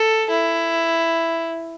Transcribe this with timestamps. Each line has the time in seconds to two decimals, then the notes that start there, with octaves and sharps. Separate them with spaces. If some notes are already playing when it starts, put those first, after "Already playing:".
Already playing: A4
0.30 E4